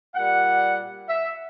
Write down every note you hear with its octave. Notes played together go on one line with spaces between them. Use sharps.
A#2 G3 F#5
E5